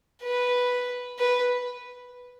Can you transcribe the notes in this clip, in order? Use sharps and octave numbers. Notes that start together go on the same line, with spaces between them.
B4
B4